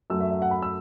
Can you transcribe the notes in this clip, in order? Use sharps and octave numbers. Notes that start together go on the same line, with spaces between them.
F#2 F#3 A3 E6
E5
E5
F#5
B5
E6